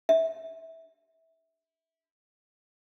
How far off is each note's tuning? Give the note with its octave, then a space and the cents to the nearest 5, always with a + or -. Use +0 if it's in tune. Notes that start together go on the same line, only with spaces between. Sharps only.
E5 -20